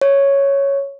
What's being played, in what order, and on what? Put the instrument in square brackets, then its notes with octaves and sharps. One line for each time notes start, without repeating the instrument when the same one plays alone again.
[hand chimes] C#5